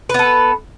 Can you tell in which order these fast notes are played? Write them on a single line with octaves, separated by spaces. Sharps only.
B4 B3 A4